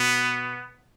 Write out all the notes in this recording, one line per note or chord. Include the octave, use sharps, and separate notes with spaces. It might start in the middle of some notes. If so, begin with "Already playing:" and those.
Already playing: B2 B3